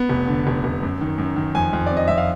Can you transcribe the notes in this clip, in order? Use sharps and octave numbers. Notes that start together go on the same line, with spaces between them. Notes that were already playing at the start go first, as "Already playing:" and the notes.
Already playing: B3
F1
D3
F1
F1
F#2
D#3
F#2
D#3
F2 G#5
F2
C4 D5
D#5
F2 E5
F5